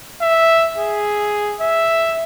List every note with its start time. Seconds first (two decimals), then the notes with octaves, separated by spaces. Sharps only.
0.22 E5
0.78 G#4
1.61 E5